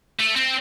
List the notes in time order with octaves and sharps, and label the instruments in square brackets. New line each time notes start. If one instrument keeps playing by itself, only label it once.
[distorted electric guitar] A3
C4